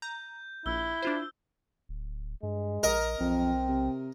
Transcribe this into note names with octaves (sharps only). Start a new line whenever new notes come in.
A#5 G6
A#1 E4 E6 G7
D4 F4 C5
D1
G2 G#3
A#1 A#4 D#5
B1 F2 C4
C3